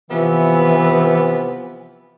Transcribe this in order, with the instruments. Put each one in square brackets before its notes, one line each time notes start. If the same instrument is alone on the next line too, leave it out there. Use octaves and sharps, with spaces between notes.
[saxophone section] C3 F3 B3 [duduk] E3